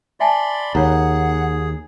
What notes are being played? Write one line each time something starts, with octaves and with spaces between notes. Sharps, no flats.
D5 E5 G#5 A5 B5 C6
D#2 G#4 C#5 F#5 A#5